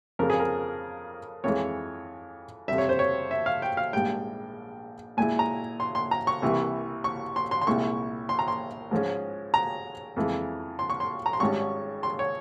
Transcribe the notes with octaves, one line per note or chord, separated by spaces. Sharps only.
F2 C#3 F3 A#4
G#4
A#4
F2 E3 G#3 C#5
F2 C3 G3 E5
C#5
C5
C#5
E5
F5
G5
F5
A#1 G#2 G3 G5
A#2 G#3 E4 G#5
A#5
C6
C6
A#5
C#6
C2 C3 E3 A#3
C#6
C6
C6
C6
C2 A#2 G#3 E4 C#6
C6
A#5
C6
G#2 F3 G#3 C#4
A#5
F2 E3 G#3
C6
C#6
C6
A#5
C6
G#1 G#2 G3 C#4 C#6
C6
C#5